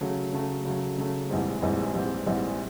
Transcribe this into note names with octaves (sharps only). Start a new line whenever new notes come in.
C#3 F#3 A3
C#3 F#3 A3
C#3 F#3 A3
C#3 F#3 A3
A#1 G#2 E3 G3 C4
A#1 G#2 E3 G3 C4
A#1 G#2 E3 G3 C4
A#1 G#2 E3 G3 C4